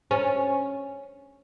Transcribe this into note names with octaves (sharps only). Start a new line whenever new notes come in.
C#4